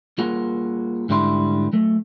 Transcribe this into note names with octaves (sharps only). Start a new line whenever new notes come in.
G3 A#3 F4 G#4 F#5
G#2 D3 G3 E4 C6
F#3 A3